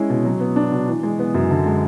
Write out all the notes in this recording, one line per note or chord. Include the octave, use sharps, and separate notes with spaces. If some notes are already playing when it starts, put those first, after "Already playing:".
Already playing: G#3 C#4 E4
B2
F#3
B3
D4
B2
E3
G#3
B3
F#2
D3
G#3